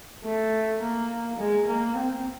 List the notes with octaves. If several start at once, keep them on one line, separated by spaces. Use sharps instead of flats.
A3
A#3
G#3
A#3
C4